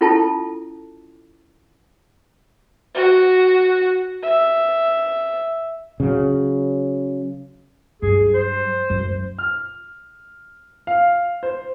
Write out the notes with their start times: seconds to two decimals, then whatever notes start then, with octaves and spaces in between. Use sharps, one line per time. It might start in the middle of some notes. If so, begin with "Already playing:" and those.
0.01 C#4 E4 F4 A4 G5 A5
2.95 F#4
4.23 E5
6.00 C#3 F#3
8.02 G2 F#3 G#4
8.34 C5
8.90 F#2
9.39 F6
10.87 F5
11.43 C5